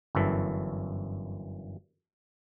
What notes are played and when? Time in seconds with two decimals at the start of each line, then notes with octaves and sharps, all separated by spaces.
0.15 G1 F#2 E3 A4